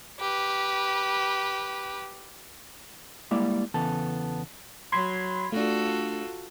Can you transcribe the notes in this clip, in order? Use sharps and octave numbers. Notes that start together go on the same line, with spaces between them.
G4 B4
G3 G#3 A#3 E4 D5
E2 C#3 E3 B3 A4 A5
F#3 B5 C6 G#6
A3 D4 F4 F#4 A4